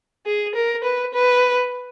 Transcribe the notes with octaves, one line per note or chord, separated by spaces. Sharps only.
G#4
A#4
B4
B4